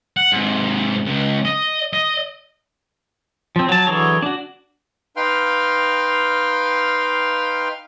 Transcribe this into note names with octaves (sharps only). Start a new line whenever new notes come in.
F#5
G#2 C3
C#2
D#5
D#5
F3 C4
F#3 A5
D3 E3 F#3 G#4 C#5
D4 F#4
D#4 B4 F5 G5 C6 F6